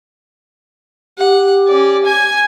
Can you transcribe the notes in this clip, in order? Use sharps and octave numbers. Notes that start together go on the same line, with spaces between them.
G4 F#5
C#4 D5
G#5 G#6